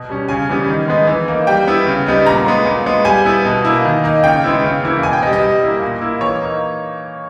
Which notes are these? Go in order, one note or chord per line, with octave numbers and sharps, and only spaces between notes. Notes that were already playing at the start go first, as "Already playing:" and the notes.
Already playing: B2
G3 C#4
C#3 G#5
E3 G3 B3
D#3
G#3 B3 D#4
E3
A#3 D#4
G3 G5
B3 E4
C#3
G3 B3 D#4
A#2 A#5
G#3 B3
A#2
G#3 B3
G3 G#5
B3 E4
B2
A#3 E4
D#3
A#3 D#4
C#3 G5
G#3 B3 E4
C#3
E3 A#3 E4
B2 G#5
G5
G3 B3 D#5
D#5
G3
A#3 E4
A#2
A#3 E4
E3 C#5
A#3 D#4